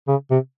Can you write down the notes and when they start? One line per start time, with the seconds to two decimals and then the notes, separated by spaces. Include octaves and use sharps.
0.08 C#3
0.31 C3